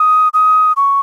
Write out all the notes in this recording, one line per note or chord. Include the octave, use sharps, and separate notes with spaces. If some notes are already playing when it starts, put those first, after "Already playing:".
Already playing: D#6
D#6
C#6